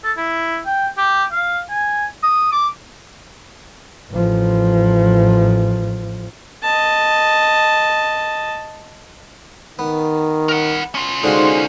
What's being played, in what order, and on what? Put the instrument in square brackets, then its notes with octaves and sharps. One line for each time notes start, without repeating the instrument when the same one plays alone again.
[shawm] A4
E4
G5
G4
F5
G#5
D#6
D6
[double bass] A1 F3
[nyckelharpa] D#5 A5
[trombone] D#3 [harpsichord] B3
[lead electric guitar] A#4 F#5
C#4 F4
[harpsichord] D3 F#4 F5 [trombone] G#3 [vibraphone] D#4 C5 C6